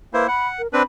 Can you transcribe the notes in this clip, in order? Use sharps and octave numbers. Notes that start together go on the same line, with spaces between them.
A#3 E4 B4 C5
F#5 B5
A#4
C4 D4 B4 B5